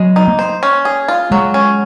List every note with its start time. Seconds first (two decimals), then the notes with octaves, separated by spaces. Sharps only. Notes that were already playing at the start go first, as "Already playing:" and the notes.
Already playing: F#3 G#3
0.16 D#4
0.28 A#3
0.39 C5
0.63 C#4
0.85 G#4
1.08 F4
1.31 F#3 G#3
1.54 C#4